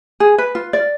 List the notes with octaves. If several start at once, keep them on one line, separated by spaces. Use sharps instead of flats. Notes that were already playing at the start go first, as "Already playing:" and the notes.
G#4
B4
F4
D5